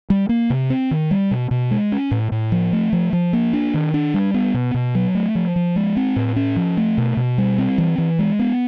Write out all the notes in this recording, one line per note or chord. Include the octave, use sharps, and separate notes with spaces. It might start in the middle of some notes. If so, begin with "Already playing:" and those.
G3
A#3
C3
C4
D#3
G3
B2
B2
G#3
C#4
A2
A2
F3
A3
F3
F3
A#3
D4
D#3
D4
G3
B3
B2
B2
F#3
A3
F3
F3
G#3
C4
A2
C#4
F3
A3
B2
B2
G3
C4
E3
E3
G#3
B3